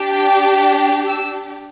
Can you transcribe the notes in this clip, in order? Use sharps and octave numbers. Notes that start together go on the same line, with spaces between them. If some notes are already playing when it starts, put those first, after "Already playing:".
Already playing: D4 G4
G5
E6